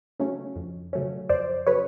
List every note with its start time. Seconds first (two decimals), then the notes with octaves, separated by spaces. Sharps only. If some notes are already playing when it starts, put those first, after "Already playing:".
0.19 C#3 F#3 A3 C#4
0.56 F2
0.93 C#3 F#3 A3 C#4
1.29 F2 C5 D5
1.67 C#3 F#3 A3 C#4 B4 C#5